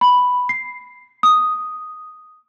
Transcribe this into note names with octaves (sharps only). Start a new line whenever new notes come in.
B5
C7
D#6